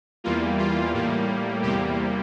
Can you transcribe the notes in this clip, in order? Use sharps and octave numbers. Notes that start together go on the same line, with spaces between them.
E2 E3 G3 A#3 F4
F4
A2 G3 A#3
E2 C3 G3 A#3 G4